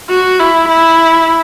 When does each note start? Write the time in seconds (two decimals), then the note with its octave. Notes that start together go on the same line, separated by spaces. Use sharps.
0.10 F#4
0.40 E4
0.69 E4